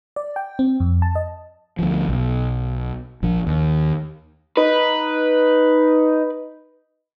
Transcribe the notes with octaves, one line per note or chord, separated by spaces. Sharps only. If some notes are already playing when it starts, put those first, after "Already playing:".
D5
G5
C4
F2
A5
D#5
D2 F3
B1
A#1 F3
D#2
D#4 B4